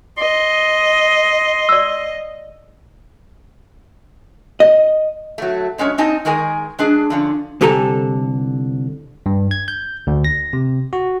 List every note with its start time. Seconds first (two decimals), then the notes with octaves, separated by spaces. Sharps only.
0.18 D#5 C6
1.69 D5 E6
4.60 D#5
5.38 F#3 A3
5.78 F#2 G#3 C#4 C#5
5.98 C4 D#4 G#5 A5
6.25 D#3 G#3 G#4 A#4 G#5
6.79 G#3 D4 G#4
7.10 D3 F3 C#4
7.61 C2 D3 G4 A4 G#5 A#5
9.26 G2
9.51 G#6
9.68 G6
10.07 D2
10.25 A#6
10.53 C3
10.93 F#4